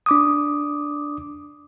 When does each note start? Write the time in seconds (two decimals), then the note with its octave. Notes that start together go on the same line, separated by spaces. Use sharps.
0.06 D4 D6 D#6